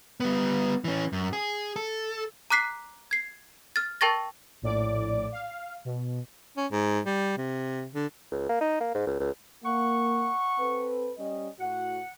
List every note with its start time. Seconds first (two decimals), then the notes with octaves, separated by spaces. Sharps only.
0.20 G3 B3
0.84 E3 C#4
1.13 F#2
1.33 G#4
1.76 A4
2.50 A#5 D6 F#6 B6 C7
3.11 G#6 C7
3.76 F6 A6
4.01 A#4 G5 A5 C#6 A6 A#6
4.62 A#1 A2 D5 D6
5.32 F5
5.85 B2
6.57 C#4
6.71 G#2
7.05 G3
7.38 C3
7.94 D3
8.32 C#2
8.49 A#3
8.61 D#4
8.80 A#3
8.95 G#2
9.07 C#2
9.20 C#2
9.64 A#3 F#5 C#6
10.59 C4 A4 B4
11.18 G3 C#4 D#5
11.60 A2 F#4 F#5